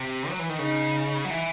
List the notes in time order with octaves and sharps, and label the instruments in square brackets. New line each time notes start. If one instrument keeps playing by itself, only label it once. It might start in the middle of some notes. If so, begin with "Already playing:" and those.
Already playing: [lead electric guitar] C3
F#3
E3
D#3
[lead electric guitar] C#3 [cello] D#4
[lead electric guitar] F#3
E3